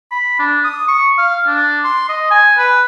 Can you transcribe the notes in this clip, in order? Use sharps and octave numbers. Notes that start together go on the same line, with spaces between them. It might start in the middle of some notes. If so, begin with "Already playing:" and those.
B5
D4
D#6
C#6
F5
D4
C6
D#5
G#5
B4